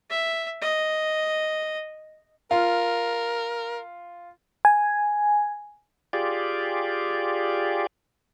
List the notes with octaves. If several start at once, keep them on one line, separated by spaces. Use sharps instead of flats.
E5
D#5
F4 A#4
G#5
F4 G4 G#4 D5